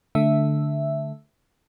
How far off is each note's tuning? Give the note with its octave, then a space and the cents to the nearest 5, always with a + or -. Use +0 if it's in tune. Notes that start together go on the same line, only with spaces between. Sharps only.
D3 +0 A3 -10 E5 +0